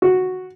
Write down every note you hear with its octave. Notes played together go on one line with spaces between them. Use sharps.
F#4